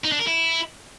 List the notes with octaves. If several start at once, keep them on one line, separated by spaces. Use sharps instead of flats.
D#4
D4
A#4
E4